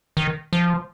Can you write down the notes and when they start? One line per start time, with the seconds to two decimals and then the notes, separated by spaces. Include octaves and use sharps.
0.17 D#3
0.53 F3